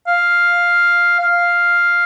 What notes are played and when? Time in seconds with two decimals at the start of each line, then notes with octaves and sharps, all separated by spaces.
0.07 F5
1.20 F5